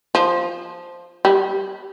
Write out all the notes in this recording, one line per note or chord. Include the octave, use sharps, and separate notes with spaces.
F3
G3